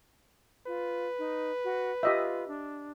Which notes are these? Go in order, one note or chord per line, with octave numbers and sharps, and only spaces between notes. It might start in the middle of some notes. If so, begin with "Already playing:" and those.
F4 B4
D#4
F#4
F4 G4 D#5 E5
D4